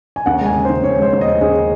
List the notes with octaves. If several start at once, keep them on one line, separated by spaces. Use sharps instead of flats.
G#5
D#2 F#5
G#3 G#5
C#3
C5
D#2
D#2 C#5
G#3 C5
D#2
D#5
D#2
D#2 G#4